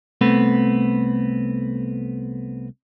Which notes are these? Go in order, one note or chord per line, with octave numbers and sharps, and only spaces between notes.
C2 A3 B3 C4 B4